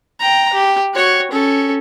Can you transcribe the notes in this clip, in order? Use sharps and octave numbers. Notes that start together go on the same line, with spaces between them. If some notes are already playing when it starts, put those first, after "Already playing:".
G5 A#5
G4
F#4 C#5
C#4 A4